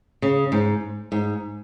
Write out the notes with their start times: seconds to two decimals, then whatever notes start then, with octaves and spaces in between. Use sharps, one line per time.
0.22 C#3
0.52 G#2
1.12 G#2